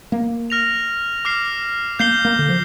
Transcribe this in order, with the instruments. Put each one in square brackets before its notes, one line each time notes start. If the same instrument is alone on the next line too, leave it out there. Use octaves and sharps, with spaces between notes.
[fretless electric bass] A#3
[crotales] F6 A#6 F7
D6 F6 C7
[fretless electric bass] A#3 [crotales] G6 C7 G7
[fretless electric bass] A#3
D3
F3